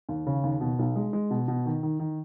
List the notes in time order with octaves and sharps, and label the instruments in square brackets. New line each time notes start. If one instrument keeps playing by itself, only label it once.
[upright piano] D#2
C#3
D#2
B2
B1
G#3
G#3
B2
B2
D#3
D#3
D#3